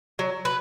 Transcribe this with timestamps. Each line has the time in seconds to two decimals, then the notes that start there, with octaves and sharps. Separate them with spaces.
0.19 F#3
0.45 B4